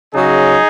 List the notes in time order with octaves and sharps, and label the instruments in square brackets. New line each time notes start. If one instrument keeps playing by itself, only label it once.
[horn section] C#3 F#3 D#4 G#4